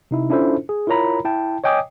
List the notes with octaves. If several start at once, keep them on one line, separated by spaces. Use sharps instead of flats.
C3 D#4 E4
C#4 D4 E4 F4 A4 C5
G#4
E4 F4 A#4 C#5 A#5 B5
E4 G5 A5
C#5 D#5 G5 G#5 D6 D#6